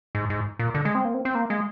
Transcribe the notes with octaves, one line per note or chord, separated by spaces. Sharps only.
G#2
G#2
A#2
D3
G#3
C4
A#3
C4
C4
A#3
G#3